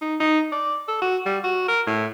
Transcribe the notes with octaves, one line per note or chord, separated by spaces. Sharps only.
D#4
D#4
D5
A4
F#4
G3
F#4
A#4
A2